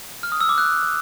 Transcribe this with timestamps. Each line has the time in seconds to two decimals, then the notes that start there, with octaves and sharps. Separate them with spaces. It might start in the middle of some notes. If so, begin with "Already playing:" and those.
0.23 F6
0.32 D#6
0.41 E6
0.49 D6
0.58 F#6